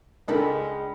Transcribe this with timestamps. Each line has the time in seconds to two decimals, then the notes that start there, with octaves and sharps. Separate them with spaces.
0.28 C#2 G#3 D4 D#4 A4 A#4 B5